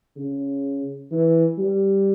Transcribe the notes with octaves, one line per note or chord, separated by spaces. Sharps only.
C#3
E3
G3